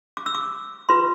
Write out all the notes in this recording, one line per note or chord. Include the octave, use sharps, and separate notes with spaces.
D6
E6
D6
F4 B4 C6